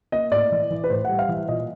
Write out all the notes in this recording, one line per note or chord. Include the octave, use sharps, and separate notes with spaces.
A#3 D#5
A2 D5
E3
E3
B4
A2 C5
G3 F#5
F5
E3 E5
A#2 D#5